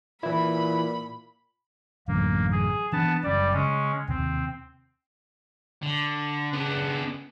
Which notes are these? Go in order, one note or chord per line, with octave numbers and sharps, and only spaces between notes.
A#2 E3 E4 B5
A1 F#2 D3 A#3
G#4
E3 B3 D4 A5
F#1 G3 C#4 D5
C#3 G#3 C#4
D#2 C3 C4
D3
C#3 B3 D4